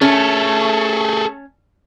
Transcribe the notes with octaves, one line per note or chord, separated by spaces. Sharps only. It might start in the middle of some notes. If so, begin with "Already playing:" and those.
A3 C#4 G#4 A4